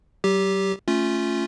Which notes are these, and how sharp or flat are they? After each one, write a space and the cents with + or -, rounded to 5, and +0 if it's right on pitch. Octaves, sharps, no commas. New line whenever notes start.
F#3 +45 G4 +0
A3 +0 C#4 +0 F4 +0